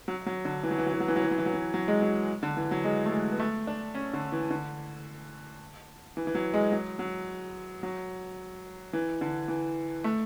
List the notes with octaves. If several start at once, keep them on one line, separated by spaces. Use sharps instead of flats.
F#3
F#3
D3
E3
F#3
E3
F#3
E3
F#3
E3
F#3
E3
F#3
E3
F#3
E3
F#3
G#3
F#3
D3
E3
F#3
G#3
A3
G#3
B3
A3
D4
C#4
D3
E3
D3
E3
E3
F#3
G#3
F#3
F#3
F#3
E3
D3
E3
A3